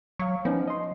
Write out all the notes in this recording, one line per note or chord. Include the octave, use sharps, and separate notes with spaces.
F#3 F5 C#6
F3 B3 C#4 D#4
D#5 C6